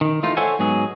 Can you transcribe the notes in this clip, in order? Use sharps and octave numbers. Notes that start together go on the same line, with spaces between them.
D#3
E3 A3 D#4 F4
A4 C5 C#5 E5 F#5 G#5
G#2 F#3 B3 G#4